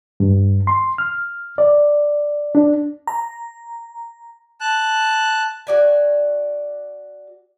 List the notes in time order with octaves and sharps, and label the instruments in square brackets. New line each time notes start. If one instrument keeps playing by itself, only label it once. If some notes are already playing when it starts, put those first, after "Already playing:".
[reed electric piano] G2
C6
F6
D5
D4
[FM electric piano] A#5
[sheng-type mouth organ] A5 F#6
[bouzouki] F#4 D5 G#5